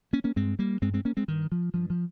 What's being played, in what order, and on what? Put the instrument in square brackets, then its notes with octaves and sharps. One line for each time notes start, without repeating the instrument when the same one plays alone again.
[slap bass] A#3 C#4
A#3 C#4
G2 G#3 C4
G3 A#3
G2 G#3 C4
G#3 C4
A#3 C#4
G#3 C4
G2 D#3
F3
G2 F3
F3